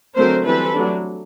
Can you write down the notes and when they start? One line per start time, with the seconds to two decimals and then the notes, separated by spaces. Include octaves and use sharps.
0.15 D3 F#3 A3 C4 A#4 C5
0.45 E3 G3 C4 A4 B4
0.75 F#3 A3 D4